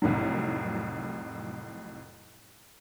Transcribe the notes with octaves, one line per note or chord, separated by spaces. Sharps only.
C2 F2 A2 D#3 F#3